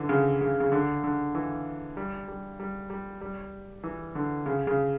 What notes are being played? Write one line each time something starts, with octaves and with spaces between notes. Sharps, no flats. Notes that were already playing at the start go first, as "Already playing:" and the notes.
Already playing: D3 E3
C#3
C#3
C#3
D3
D3
E3
G3
G3
G3
G3
G3
E3
D3
C#3
C#3